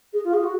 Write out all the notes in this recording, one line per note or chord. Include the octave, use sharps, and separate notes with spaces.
G#4
F4
G#4
F#4